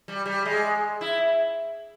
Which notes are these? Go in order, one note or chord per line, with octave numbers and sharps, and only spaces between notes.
G3
G3
G#3
E4